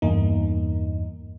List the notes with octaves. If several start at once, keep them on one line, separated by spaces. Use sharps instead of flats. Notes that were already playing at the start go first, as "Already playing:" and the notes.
E2 G2 A#3 D#4